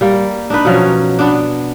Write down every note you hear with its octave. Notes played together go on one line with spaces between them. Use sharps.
G3 A#3
D4 D#4 B4
B2 F3 F#3 C#4
B3 D4